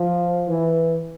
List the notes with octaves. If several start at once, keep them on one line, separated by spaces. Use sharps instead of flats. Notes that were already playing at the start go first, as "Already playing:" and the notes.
Already playing: F3
E3